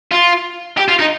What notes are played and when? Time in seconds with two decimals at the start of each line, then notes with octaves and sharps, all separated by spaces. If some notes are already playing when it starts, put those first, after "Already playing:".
0.12 F4
0.77 G4
0.88 F4
0.99 D#4